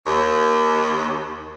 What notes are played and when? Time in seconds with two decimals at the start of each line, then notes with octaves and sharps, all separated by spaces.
0.07 D#2